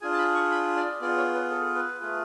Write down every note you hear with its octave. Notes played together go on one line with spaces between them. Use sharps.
D4 F4 G#4 G#5
A5
B5
C#6
B5
D5
B3 F4 G#4 D5
C#5
B4
A4
B4
A3 F4 G#4